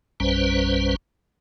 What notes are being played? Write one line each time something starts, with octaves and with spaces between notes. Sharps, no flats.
A#1 F#2 G3 C#4 B4 C5